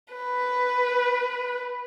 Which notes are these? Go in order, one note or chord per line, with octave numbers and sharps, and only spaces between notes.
B4